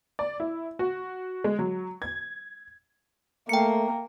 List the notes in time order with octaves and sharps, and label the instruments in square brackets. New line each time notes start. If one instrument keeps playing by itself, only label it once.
[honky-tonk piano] D5
E4
F#4
G#3
F#3
G#6
[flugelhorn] A3 [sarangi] A#3 [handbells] G5 C#7